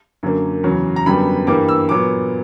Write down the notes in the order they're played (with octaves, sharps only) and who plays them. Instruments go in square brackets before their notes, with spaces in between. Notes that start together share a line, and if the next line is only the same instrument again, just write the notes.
[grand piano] F#2 D3 A#3
E2 C#3 F#3
A#5
F#2 D3 G3 B3 B5
G2 E3 G3 A#3 D6
E6
A#2 F#3 B3 D6